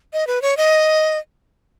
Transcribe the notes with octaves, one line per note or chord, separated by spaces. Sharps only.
D#5
B4
C#5
D#5